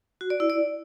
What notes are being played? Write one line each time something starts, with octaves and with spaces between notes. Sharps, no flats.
F#4
D5
E4
D5